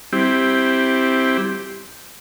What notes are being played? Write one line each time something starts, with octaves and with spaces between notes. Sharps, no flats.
G3 C4 E4 G4